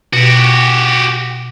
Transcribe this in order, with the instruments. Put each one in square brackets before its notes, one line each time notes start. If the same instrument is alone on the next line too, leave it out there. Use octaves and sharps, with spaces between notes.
[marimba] B2 [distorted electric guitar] F#4 G4